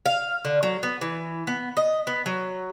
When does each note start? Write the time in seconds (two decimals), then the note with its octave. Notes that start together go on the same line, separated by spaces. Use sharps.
0.06 F5
0.45 D3
0.63 F#3
0.83 B3
1.01 E3
1.47 B3
1.77 D#5
2.07 B3
2.26 F#3